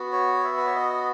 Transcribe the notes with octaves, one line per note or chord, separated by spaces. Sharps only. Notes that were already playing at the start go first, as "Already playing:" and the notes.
Already playing: B3 F#4
C#5
E5
B4
C#5
D#5